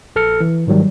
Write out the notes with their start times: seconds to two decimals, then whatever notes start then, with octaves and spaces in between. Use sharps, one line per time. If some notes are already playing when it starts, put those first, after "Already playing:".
0.16 A#1 A4 F6 C#7
0.40 E3
0.67 G#2 D#3 F#3 G3